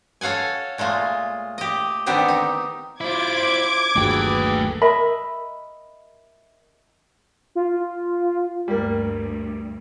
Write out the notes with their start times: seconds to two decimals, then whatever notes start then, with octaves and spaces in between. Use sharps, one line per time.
0.21 A4 C#5 F5 F#5 G#5
0.78 A#2 G#3 A3 F4
1.58 G4 D#5
2.06 D3 D#3 B3 C4 G4 C5
2.28 D#4
3.01 E4 F4 C5 D6 G#6
3.96 G1 D#2 F#3 A3 G#4 A4 B4 G5
4.81 A#4 D#5 E5 B5
7.55 F4
8.68 D2 G2 G3 A#3